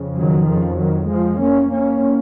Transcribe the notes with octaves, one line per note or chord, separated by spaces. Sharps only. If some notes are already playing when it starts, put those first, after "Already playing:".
Already playing: F2 C#3
D#3 F#3
C#3 F3
D#3 F#3
F3 G#3
A#3 C#4
A#3 C#4